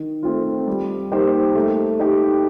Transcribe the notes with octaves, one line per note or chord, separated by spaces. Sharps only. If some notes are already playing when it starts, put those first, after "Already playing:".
Already playing: D#3
A3 C4 F4
G3
A#3 D#4 G4 C5
A3
D#4 G4